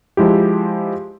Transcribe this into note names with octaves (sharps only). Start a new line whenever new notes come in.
F3 G#3 E4 G4